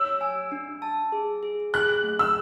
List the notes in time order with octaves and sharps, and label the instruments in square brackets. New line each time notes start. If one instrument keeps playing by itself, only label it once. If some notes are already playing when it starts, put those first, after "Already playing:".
Already playing: [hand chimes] C#5 [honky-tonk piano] E6
[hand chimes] G#5
D4
A5
G#4
G#4
[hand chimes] G#4 [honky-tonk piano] F#6
[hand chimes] A3
[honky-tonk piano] E6